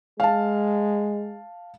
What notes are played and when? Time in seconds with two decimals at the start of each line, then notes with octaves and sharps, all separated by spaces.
0.20 G#3 F5 A5